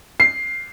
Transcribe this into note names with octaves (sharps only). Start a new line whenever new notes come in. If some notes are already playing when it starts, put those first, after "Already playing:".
C7